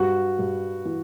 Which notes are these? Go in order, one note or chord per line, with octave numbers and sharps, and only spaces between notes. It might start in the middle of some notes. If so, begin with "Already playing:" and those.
Already playing: G2 F#4
G2
E3